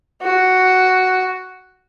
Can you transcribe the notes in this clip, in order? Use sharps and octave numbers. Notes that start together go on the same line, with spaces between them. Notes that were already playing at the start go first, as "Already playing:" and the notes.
F#4